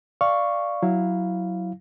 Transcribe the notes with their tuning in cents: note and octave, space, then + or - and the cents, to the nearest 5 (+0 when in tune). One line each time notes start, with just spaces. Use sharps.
D5 +5 F5 -10 C#6 +0
F#3 +0 E4 +0 F5 +0